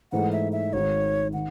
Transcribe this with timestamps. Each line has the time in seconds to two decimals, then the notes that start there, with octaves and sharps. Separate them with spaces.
0.12 G#2 E3 A3 D#4 G#4 F#5
0.32 E5
0.52 E5
0.73 G#1 G#2 D#3 C#5
1.33 D#3 F#5